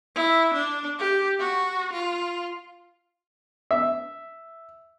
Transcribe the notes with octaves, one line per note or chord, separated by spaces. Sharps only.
E4
D4
G4
F#4
F4
E5